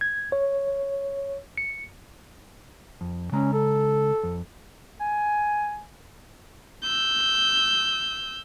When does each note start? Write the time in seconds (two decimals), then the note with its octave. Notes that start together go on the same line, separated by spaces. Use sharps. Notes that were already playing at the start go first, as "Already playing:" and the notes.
0.01 G#6
0.32 C#5
1.58 C#7
3.01 F2
3.32 C#3 G#3 C#4 A#5
3.54 A4
4.23 F2
5.00 G#5
6.83 E6 G6